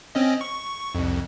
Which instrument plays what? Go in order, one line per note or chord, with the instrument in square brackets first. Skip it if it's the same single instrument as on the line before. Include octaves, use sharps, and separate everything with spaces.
[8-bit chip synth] C4 C#4 D#5
C#6
C2 F2